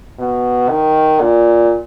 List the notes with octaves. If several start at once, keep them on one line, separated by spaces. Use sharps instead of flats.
B2
D#3
A#2